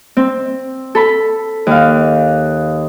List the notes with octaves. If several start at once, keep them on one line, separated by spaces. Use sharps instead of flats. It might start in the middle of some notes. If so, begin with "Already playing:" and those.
C4
A4 B5
D#2 F5